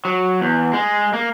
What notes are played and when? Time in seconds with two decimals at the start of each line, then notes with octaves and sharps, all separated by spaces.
0.05 F#3
0.41 E2
0.73 G#3
1.13 A#3